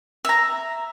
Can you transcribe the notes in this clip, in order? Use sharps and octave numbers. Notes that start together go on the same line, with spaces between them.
E5 A#5